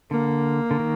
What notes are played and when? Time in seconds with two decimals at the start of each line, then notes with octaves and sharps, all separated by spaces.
0.11 D3 A#3
0.71 D3
0.80 D#3